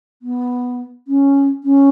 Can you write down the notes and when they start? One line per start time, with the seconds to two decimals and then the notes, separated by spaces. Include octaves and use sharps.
0.22 B3
1.08 C#4
1.64 C#4